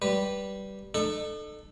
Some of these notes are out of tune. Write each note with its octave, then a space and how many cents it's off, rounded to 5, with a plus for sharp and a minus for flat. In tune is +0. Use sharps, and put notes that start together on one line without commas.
G3 -10 B4 -10
D#4 -45 A4 +0